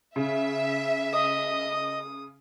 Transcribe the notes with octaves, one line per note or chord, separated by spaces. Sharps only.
C#3 E5
D#5 D#6